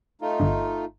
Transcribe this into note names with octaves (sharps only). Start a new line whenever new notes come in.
A3 D#4 F4
G1 G2